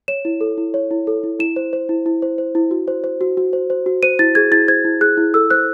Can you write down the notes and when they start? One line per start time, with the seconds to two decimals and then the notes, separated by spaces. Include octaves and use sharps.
0.08 C#5 E7
0.25 E4
0.41 A4
0.58 E4
0.74 C#5
0.91 E4
1.07 A4
1.23 E4
1.39 E4 E7
1.56 C5
1.73 C5
1.89 E4
2.06 E4
2.22 C5
2.38 C5
2.55 E4
2.71 F#4
2.88 C5
3.04 C5
3.21 F#4
3.37 F#4
3.53 C5
3.70 C5
3.86 F#4
4.03 C5 D#7
4.19 E4 A6
4.35 G#4 G#6
4.51 E4 A6
4.68 C5 G#6
4.85 E4
5.01 G#4 F#6
5.17 E4
5.34 A4 E6
5.50 C5 F#6